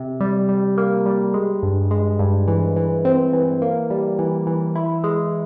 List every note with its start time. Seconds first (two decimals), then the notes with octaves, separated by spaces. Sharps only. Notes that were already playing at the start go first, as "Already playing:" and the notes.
Already playing: C3
0.21 G3
0.49 G3
0.77 A#3
1.06 G3
1.34 G#3
1.63 G2
1.91 G#3
2.19 G2
2.48 E3
2.76 E3
3.05 C4
3.33 E3
3.62 A#3
3.90 G3
4.19 E3
4.47 E3
4.75 E4
5.04 G#3